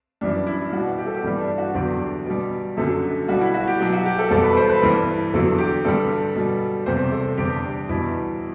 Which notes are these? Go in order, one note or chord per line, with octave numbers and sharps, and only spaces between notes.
F#2 E3 G3 D4
E4
B2 G3 F#4
G4
A4
G4
G2 E3 G3
D4
F#4
E2 D3 F#3 G4
B2 G3
F#2 D3 F#3 A4
B2 G3 F#4
E4
F#4
G4
B2 F#3 G4
F#4
G4
A4
E2 B2 G3 A4
B4
C5
B4
G2 E3 G3
E2 D3 F#3 A4
G4
G2 D3 G3 A4
B2 G3
E2 C3 G3 C5
A4
E2 D3 G3 G4
E2 B2 G3 E4